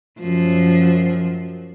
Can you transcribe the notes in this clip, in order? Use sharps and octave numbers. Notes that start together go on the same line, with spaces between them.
F#2 F3